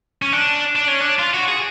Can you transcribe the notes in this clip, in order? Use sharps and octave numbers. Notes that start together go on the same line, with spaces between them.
C#4
D4
D4
C#4
D4
F4
F#4
G#4